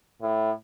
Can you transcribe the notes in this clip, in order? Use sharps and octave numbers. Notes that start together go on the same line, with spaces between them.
A2